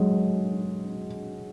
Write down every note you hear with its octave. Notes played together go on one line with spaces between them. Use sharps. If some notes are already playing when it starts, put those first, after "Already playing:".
Already playing: F#3 G#3